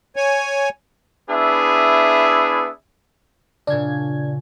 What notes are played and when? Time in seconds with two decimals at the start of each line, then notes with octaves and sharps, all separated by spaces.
0.16 C#5 G#5
1.30 B3 D4 E4 G#4 E5
3.67 A#2 C#3 D4 G#6